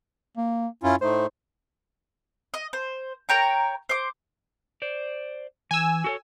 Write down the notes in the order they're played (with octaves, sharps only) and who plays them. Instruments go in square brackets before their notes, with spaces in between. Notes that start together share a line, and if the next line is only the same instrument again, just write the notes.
[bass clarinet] A#3
[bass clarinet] F#2 [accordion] C#4 E4 F4
[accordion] A2 A3 [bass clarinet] D#4 [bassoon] C5
[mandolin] D#5
C5
A#4 C#5 G5 A#5
C5 D6
[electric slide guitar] C5 D5
[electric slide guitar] E3 [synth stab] G#5 E6
[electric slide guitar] F#4 A4 C#5